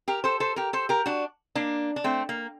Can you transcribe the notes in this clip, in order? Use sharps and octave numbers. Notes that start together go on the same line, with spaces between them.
G4 A#4
A4 C5
A4 C5
G4 A#4
A4 C5
G4 A#4
D4 F#4
A#3 D4
D4
A3 C4
A#3